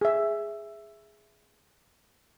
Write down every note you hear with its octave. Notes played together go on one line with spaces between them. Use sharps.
G#4 E5